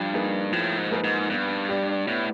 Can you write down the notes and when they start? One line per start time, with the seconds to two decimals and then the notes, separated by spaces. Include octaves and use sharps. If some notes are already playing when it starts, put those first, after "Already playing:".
Already playing: G2 F3
0.13 A#3 D#4 G#4 B4
0.52 A2 F3
0.77 G#2
0.91 A#3 D#4 G#4 B4
1.04 G#2
1.30 G2 B3
1.69 D4 G4
2.07 A2 B3